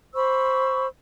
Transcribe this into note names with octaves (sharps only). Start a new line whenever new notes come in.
C5 B5 C#6 E6